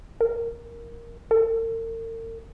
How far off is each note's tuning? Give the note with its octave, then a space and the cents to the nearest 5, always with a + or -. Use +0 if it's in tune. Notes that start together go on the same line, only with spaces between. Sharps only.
A#4 +5
A#4 -45